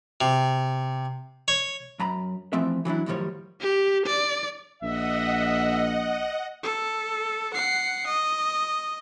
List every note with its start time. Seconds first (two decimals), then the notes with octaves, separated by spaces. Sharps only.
0.21 C3
1.48 C#5
2.00 F#2 A#5 B5
2.53 E2 E3 F3 A3 C4 E5
2.85 E3 F#3 D4 E4
3.06 F#2 A2 D#3 F3 G3 C#5
3.61 G4
4.06 D5
4.82 A#1 D#5 E5 F#5
6.63 A4
7.54 F#5 C7
8.06 D#5